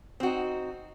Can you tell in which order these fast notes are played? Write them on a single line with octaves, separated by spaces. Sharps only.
C4 F#4 D#4